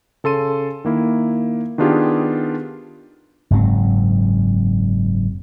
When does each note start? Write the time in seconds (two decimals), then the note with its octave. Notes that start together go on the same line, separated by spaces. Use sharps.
0.24 C#3 A4 C6 D#7
0.85 D#3 A#3 E4
1.78 D#3 B3 D4 F4 G4 G#4
3.50 F#1 G#2 F#3 C4